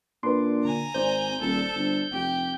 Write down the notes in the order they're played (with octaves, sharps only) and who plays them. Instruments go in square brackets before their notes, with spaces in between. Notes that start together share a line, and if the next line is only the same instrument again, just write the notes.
[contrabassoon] A#2 [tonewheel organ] D4 [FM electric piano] B4 C6
[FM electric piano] D3 [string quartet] G#5 A#5
[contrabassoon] G#1 [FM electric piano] C5 D5 [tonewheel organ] G6
[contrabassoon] D#1 [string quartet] A4
[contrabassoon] G1
[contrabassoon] F1 [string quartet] G4